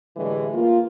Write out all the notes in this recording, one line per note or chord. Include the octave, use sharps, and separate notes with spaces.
A2 D3 E3 G3 G#3
A#3 F4